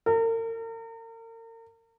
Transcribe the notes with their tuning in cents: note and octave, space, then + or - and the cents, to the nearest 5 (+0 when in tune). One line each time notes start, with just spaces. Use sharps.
A#4 -40